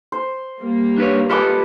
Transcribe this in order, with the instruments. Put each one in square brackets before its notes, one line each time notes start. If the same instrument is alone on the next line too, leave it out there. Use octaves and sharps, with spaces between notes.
[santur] C5
[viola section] G3 A#3
[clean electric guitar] D4 B4 C#5
[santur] F4 B4 D6 [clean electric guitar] G4 A4 D#5